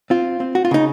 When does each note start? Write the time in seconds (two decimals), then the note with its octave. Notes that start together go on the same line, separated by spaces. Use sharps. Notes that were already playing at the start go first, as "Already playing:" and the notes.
0.10 C4 F4
0.40 C4
0.55 F#4
0.65 F4
0.71 C#3 D#4